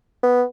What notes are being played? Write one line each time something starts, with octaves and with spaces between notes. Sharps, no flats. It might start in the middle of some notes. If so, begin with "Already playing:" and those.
B3